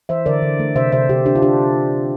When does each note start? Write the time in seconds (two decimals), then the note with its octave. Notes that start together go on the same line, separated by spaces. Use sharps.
0.09 E3 C5 E5
0.26 D3 A#4 D5
0.42 D3
0.59 A3
0.75 C3 C5 E5
0.92 C3 C5 E5
1.09 C3 G4
1.26 D4 G4
1.36 F4
1.42 D4 G4